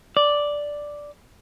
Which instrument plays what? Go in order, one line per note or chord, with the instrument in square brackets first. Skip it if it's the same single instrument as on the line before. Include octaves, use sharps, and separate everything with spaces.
[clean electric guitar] D5